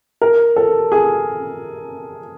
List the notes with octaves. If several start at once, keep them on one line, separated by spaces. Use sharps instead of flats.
A#4
A4
G#4